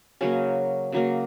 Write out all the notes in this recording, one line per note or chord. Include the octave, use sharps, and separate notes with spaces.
C#3 F#3 A#3 C#4
C#3 F#3 A#3